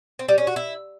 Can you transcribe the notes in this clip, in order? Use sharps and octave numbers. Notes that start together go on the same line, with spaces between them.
C4
G3
C#4
F#4
E4